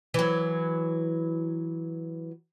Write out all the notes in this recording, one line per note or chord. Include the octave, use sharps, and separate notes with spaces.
E3 F#3